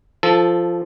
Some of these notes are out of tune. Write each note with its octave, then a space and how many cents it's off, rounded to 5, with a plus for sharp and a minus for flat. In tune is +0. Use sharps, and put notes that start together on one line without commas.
F3 -10 A4 +0